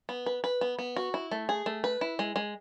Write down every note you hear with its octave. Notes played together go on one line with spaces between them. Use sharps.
B3
B4
B4
B3
B3
F#4
E4
A3
G#4
A3
B4
E4
G#3
G#3